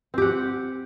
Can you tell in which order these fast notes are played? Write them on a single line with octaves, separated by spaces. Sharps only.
C4 G4 F#5